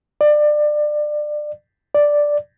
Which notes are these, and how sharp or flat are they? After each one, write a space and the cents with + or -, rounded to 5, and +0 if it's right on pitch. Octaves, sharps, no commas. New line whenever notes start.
D5 +25
D5 +0